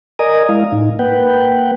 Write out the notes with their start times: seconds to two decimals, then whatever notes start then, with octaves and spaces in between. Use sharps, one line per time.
0.19 A#4 D5 D#5 G#5 A#5 D#6
0.49 G#3 E4 F5
0.72 A2 D#4
0.99 A#3 B4 F#5 G5